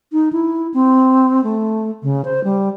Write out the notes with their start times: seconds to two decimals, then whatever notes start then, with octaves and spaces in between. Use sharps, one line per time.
0.12 D#4
0.33 E4
0.74 C4
1.44 A3
2.03 C#3
2.25 C5
2.44 G3